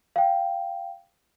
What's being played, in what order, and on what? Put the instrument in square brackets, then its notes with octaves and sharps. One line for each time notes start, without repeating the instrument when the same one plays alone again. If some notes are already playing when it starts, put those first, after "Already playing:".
[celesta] F5 G5